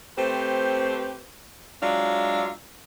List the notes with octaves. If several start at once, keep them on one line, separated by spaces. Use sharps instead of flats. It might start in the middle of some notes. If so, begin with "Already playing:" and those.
A3 C4 G4 B4 C5
F#3 G#3 D4 F4 E5 F5